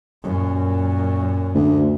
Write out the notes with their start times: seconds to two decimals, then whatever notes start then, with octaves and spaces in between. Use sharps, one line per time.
0.23 F#2 A#2
1.54 D2